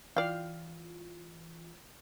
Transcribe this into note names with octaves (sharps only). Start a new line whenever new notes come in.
E3 F4 D5 F5 G5